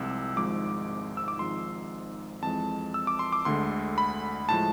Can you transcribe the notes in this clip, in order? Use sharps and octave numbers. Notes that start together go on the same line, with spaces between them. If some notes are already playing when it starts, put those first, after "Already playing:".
Already playing: C2 C3 F3 G#3 E6
G#1 G#2 F3 G#3 D6
E6
D6
G#1 G#2 F3 G#3 C6
F2 E3 G#3 A5
E6
D6
C6
D6
D2 D3 G#3 C6
B5
A2 F3 G#3 A5